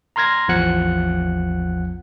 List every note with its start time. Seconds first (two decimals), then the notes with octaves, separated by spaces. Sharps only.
0.16 A#5 C6 F6 G#6 A#6
0.48 A1 E2 F3 F#5 F#6 C#7